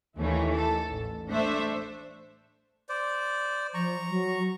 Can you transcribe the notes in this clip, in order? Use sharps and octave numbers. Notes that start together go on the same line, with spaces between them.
D#2 D#3 E3 A3 C#4
A4
A1
A3 D4 C5 E5
C5 D5
F3 A#5 C#6
F#3